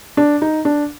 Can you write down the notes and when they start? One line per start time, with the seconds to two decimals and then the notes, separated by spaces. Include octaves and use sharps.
0.17 D4
0.42 D#4
0.65 D4